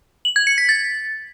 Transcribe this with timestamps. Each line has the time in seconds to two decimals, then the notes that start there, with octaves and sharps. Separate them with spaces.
0.25 F#7
0.36 G#6
0.47 C#7
0.58 B6
0.69 A6